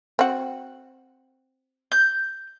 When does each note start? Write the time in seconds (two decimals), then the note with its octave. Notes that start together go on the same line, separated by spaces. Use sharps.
0.19 C4 F#4
1.92 G6